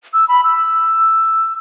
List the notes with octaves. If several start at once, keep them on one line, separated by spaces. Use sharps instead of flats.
E6
B5
E6